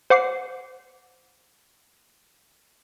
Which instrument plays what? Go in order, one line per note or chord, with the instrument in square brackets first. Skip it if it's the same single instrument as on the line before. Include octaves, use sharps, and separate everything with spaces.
[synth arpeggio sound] C5 F#5 D6 C7